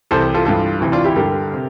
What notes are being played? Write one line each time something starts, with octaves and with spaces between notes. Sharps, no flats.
C2 C3 E3 A4 C5
F4 A4
G2 E3 F4 A4
D2 C3 E3
D4 F4
E4 G4
G2 D3 G4 A#4
C3